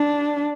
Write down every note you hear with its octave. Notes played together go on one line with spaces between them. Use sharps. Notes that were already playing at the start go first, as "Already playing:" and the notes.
Already playing: D4